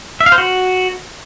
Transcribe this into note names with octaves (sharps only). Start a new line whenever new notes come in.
E5
F5
C5
F#4